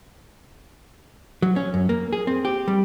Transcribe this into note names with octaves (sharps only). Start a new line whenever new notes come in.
F#3
C#4
F#2
A#3
G#4
C4
G4
G3